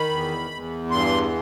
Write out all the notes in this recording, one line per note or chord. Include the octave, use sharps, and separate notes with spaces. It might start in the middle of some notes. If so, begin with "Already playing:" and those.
Already playing: D#3 B5
E2
E2
G2 C6